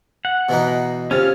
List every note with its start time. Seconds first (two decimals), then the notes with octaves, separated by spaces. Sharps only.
0.25 F#5
0.49 B2 E3 D#4
1.11 C3 C#4 F4